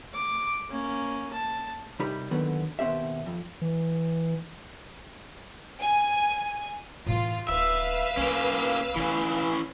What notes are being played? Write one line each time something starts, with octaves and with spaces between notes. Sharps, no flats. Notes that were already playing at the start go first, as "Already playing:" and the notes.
D6
A#3 C#4
A5
C2 G3 D#4 G4 B5
D#2 B2 D3 D#3 F#3 B3
D#2 B2 C4 G4 E5
F2
E3
G#5
A2 E3 F4
D1 D#4 B4 E5 F5 E6
B1 A#3 C#4
D3 E3 B3 C#4